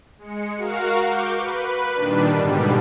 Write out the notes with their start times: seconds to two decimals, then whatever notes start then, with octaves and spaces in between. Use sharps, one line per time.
0.18 G#3 C#7
0.58 F#4 A#4 F5
1.06 C#6 D6 G6
1.37 B4
1.94 A#2 D#3 G3 D4
2.33 G#2 B2 D3 G3